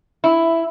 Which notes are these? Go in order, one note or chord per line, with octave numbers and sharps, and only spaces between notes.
E4